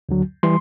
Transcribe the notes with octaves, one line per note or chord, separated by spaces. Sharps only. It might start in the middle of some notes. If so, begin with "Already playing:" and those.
D2 D3 F#3
E3 G3 C6